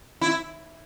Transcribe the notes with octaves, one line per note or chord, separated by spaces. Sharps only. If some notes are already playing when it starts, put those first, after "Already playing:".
E4